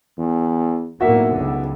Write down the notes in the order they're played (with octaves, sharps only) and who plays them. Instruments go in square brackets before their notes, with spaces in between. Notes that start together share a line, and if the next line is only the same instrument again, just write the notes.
[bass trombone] E2
[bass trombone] B1 [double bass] A2 A#3 [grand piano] F#4 E5
[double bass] C#2 D3